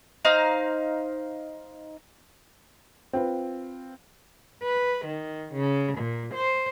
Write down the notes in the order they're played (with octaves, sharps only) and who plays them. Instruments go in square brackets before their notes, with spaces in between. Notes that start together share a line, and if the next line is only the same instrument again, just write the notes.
[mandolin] D#4 C5 F5 A#5
[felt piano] C4 F4 B4
[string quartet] B4
D#3
C#3
A#2
C5